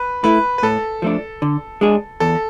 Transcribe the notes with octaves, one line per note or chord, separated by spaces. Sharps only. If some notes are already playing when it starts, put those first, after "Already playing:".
Already playing: B4
A3 E4 B4
B4
A2 A4
F3 A3 D4
D3
G#3 D4 G#4
E2 A4